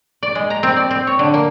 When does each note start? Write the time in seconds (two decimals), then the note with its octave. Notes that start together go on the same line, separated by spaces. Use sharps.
0.23 D5
0.35 G#3
0.50 A#5
0.63 C4
0.77 D5
0.91 C4
1.07 C#5
1.19 D3
1.34 A#3